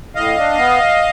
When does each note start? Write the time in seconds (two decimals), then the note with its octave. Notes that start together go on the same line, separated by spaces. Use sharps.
0.15 A2 D#5 F5
0.37 D4
0.58 B3